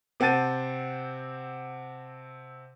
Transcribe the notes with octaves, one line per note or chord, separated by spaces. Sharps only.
C3 C4 F#5 A5 A6 D#7